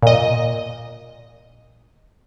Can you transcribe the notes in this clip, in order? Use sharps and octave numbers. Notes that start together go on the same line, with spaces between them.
A#2 D#5